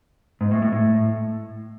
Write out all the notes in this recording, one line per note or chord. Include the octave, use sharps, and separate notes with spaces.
G#2
A2
A2
A2